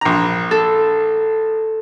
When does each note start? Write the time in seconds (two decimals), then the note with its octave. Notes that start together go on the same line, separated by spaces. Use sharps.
0.01 A#1 A#5
0.51 A4